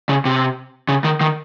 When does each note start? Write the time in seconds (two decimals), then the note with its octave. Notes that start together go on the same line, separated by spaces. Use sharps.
0.09 C#3
0.25 C3
0.89 C#3
1.04 D#3
1.21 D#3